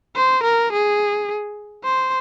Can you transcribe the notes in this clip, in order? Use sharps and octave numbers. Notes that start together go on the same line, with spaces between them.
C5
A#4
G#4
C5